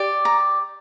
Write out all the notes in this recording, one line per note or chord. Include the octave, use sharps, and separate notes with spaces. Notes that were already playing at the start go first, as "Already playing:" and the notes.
Already playing: G4 D5
A#5